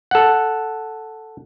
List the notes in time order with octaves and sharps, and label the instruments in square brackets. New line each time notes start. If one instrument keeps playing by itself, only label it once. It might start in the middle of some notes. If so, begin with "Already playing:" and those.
[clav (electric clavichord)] A4 F#5